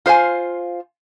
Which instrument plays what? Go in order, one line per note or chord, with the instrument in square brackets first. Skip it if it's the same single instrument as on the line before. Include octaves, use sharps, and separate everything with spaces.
[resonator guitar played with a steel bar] F4 C5 F5 G#5